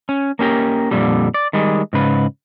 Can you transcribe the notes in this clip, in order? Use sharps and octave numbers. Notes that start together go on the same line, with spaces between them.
C#4
A#3 C#4 G4 A#4
F2 A#2 D3 G3
D5
D#3 G3 G#3
G#2 C#3 B4